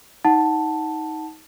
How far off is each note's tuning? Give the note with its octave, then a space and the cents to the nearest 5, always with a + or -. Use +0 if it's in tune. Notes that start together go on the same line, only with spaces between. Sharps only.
D#4 +20 F#5 +0 A5 +0